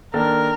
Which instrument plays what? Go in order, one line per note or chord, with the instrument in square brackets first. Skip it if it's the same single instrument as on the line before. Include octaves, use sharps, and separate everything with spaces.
[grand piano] D#3 A#3 D4 A4 [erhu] A#4